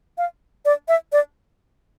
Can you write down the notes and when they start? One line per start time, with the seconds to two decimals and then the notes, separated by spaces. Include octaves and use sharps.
0.18 F5
0.65 D5
0.88 E5
1.12 D5